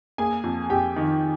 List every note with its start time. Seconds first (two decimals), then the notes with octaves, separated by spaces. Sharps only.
0.18 A#3 G#4 G#5
0.44 F2
0.70 F2 G4 G5
0.96 D#3